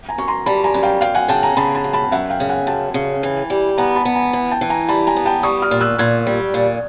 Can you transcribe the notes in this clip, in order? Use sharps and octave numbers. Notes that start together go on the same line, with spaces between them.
G#5 A#5
F#2 C#6
A#5 C6
G3 A5 B5
G#5 A#5
F#2
F5 G5
F#2 F5 G5
F#5 G#5
C#3 G5 A5
G#5 A#5
C#3 A5 B5
A5 B5
F#2
A5 B5
F#2 E5 F#5
F5 G5
C#3
F#5 G#5
F#2 G5 A5
C#3
E3
G3
B3 G#5 A#5
A5 B5
B3
G#5 A#5
E3
G5 A5
E3
G#5 A#5
G3 A5 B5
G#5 A#5
B3
G5 A5
G3 C#6 D#6
D#6 F6
A#2
E6 F#6
A#2 F#6 G#6
G3
A#2